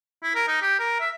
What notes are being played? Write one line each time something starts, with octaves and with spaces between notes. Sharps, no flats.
E4
A#4
D#4
G4
A#4
E5